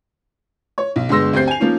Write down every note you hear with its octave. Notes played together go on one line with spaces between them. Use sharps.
C#5
B1
G1 G#3 B3 C6 E6 A#6
D2 C4 G4 C5 G6 C7
G#5 F7
F3 A#3 C#4 D#4